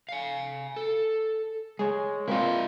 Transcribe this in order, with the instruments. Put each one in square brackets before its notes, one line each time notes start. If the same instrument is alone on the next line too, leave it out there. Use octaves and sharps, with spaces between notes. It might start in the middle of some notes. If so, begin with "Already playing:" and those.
[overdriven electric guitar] F5 G#5
A4
[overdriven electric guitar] G#3 [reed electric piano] G#4 C#5
[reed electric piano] A#3 C4 F4 [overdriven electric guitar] E4 D#5